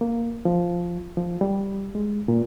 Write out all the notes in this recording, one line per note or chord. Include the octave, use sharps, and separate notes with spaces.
A#3
F3
F3
G3
G#3
A#2